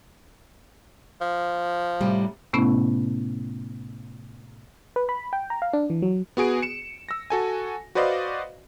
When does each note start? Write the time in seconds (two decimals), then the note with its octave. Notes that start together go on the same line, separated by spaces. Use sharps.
1.21 F3
2.01 A2 C3 G3
2.53 A2 C3 A3 B3 C#4 E4
4.96 B4
5.09 B5
5.33 G5
5.50 A#5
5.62 F5
5.73 D4
5.90 E3
6.02 F#3
6.37 B3 F#4 G#4 D7
6.62 C#7 E7
7.09 E6 A#6
7.30 F#4 A4 G#5
7.95 F#4 B4 C5 D5 D#5 F5